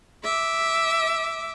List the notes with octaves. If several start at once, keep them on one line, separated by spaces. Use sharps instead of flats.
E5 D6